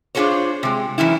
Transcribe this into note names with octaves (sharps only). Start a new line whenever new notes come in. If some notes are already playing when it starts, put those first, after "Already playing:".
D4 F4 F#4 G#4 C5 C#5
C3 G#3
F#2 C#3 E3 C#4 E4